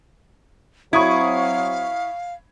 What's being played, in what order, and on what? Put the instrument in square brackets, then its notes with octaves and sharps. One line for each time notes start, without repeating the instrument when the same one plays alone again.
[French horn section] F#3 C4 [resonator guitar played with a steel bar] E4 [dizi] F5 [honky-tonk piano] C#6 D#6 G#6